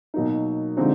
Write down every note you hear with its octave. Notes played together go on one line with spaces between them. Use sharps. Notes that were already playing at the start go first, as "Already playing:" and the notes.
B2 F#3 A#3 D#4
D3 F3 G#3 C4 D#4